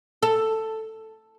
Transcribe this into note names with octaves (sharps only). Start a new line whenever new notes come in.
A4